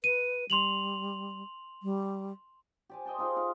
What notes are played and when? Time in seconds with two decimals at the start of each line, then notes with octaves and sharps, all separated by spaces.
0.04 B4 D#7
0.50 G3 C6 F7 F#7
1.83 G3
2.89 G4 D5 G#5
3.06 C5 D#5 G5 A5
3.18 D#4 F4 G#4
3.36 D#4 D5 F5